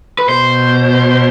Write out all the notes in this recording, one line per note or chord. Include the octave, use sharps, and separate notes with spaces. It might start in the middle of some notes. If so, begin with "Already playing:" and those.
B4
B2 C5